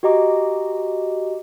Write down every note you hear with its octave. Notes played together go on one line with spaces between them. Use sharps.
F#4 G4 D#5 A#5 D6